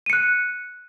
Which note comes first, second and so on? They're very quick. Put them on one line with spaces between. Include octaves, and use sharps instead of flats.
D#7 C#7 F#6